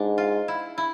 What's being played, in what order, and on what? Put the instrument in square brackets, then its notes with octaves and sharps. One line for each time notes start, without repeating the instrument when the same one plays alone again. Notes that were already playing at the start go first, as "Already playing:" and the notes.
Already playing: [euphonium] G#2 [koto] D4
[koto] F4
E4
E4